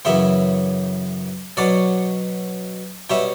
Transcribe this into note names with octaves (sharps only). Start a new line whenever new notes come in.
F#2 C#3 E3 B3 E5 G5
B2 F#3 C#4 D5 F#5
B2 G3 C#4 E5 G5